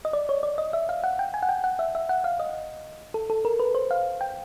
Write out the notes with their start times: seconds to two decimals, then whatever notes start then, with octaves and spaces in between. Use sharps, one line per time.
0.05 D#5
0.13 D5
0.29 C#5
0.43 D5
0.58 D#5
0.73 E5
0.89 F5
1.04 F#5
1.19 G5
1.34 G#5
1.43 F#5
1.49 G5
1.64 F#5
1.79 E5
1.95 E5
2.09 F#5
2.24 F5
2.40 D#5
3.14 A4
3.30 A4
3.45 A#4
3.60 B4
3.75 C5
3.91 F5
4.21 G5